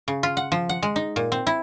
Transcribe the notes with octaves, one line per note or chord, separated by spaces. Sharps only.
C#3
F4
F#5
F3
F#5
G#3
D#4
A#2
C4
E4